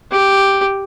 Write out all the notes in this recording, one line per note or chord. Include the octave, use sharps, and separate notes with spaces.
G4